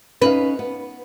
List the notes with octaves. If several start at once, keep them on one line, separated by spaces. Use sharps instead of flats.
C#4 D#4 B4 F5
B3